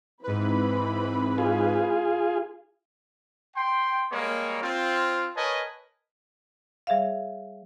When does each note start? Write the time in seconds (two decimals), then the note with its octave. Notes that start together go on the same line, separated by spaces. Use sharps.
0.23 G#2 E3 C4 B4 B5
1.38 F4 G#4
3.56 G5 C6
4.11 G3 G#3 A#3 C#5
4.63 C4 F4
5.36 A#4 B4 C#5 D#5 G#5 A5
6.87 G3 G#4 C#5 E5 F5